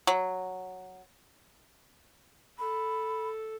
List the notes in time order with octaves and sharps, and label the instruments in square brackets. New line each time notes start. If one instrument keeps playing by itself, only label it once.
[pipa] F#3
[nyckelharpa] A4 [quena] B5